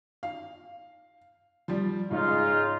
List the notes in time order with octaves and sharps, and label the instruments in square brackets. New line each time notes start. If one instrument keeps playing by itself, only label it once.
[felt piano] F5
F3 G3
[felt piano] G#2 [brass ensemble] C#3 D#4 F4